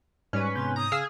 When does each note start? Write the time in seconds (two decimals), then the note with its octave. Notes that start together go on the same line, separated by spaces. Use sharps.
0.33 G#2 G3 C#4 B4 D5
0.56 C3 B3 C6 G6
0.76 A#5 D#6
0.92 C#3 G#4 F5 E6 F6